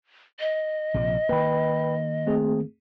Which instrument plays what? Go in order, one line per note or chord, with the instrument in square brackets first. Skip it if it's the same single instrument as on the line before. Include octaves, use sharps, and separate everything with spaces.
[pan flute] D#5
[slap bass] A#1 C3 F3
[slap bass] D#3 A#3 [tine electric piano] B4 G5 B5
[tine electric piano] A3 C4 G#4